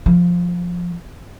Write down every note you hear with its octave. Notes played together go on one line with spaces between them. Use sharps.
F3